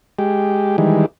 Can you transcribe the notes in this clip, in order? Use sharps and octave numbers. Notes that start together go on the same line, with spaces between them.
G#3 G4
D#3 E3 G3 G#3